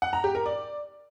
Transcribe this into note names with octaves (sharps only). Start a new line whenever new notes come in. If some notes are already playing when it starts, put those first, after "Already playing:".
F#5
A#5
G4
A#4
D5